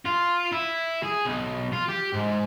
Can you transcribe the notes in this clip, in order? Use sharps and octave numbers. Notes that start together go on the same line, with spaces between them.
F4
E4
G#4
B1
F4
G4
G#2